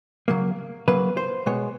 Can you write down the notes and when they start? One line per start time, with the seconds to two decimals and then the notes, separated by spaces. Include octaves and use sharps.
0.28 C#3 F#3 A#3
0.88 C#3 F#3 A#3 B4
1.17 C5
1.46 B2 G#3 B3 C#5